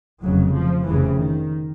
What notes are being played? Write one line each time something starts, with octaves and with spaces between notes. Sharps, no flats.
F1 F2 C#3 F#3
F3
F1 F2 C#3 E3
D#3